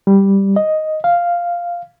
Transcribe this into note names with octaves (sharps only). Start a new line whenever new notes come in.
G3
D#5
F5